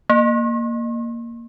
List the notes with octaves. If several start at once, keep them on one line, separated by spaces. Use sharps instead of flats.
A#3